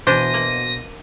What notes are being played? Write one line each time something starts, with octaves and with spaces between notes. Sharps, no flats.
B2 E3 D4 C5 A#6 D#7
A#3